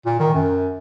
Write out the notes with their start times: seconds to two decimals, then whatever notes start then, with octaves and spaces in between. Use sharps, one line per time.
0.06 A#2
0.19 D#3
0.34 F#2